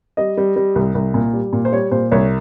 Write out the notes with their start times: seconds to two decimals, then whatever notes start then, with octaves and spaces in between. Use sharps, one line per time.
0.17 G3 D#5
0.37 G3
0.56 G3
0.76 C2
0.95 C2
1.14 A#2
1.33 G3
1.53 A#2
1.65 C5
1.72 G3 C#5
1.91 A#2 C5
2.11 C2 C#5